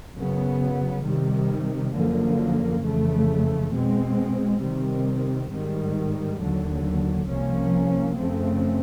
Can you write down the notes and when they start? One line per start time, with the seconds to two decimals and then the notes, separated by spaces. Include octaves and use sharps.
0.16 F#2 C#3 F#3 B3
1.04 C3 D#3 G3
1.93 F#2 D3 F3 A#3
2.82 F2 C#3 E3 A3
3.71 B2 G#3 C4
4.61 C3 D#3 G3 C4
5.50 G#2 D#3 G3
6.39 D#2 D3 F#3
7.28 C2 C3 F3 A#3 C#4
8.17 F#2 C#3 F3 A3 C4